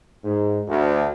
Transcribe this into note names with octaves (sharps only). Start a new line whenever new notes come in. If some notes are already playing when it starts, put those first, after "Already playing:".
G#2
D2